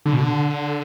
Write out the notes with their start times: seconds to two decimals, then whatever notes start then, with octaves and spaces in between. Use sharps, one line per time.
0.06 D3
0.13 B2
0.21 D3